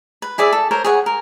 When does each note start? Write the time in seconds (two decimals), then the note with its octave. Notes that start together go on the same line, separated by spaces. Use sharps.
0.22 B4
0.38 E4 G#4 D5 E5
0.53 A4
0.71 A#4 C5 C#5
0.84 G#4 C#5 F#5
1.06 A#4